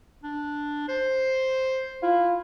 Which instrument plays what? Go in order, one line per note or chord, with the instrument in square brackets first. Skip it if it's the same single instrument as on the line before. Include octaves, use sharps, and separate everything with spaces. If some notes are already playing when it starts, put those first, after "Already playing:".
[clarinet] D4
C5
[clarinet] E4 [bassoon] F4